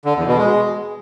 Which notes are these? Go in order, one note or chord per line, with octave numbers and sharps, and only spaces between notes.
D3
E2
B2
G#3